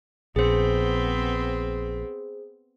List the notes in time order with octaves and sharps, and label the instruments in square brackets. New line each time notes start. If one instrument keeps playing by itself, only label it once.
[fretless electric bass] A#1 [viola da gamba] B3 C4 [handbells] G#4 C5